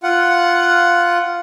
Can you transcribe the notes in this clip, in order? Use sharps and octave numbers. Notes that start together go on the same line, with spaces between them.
F4 F#5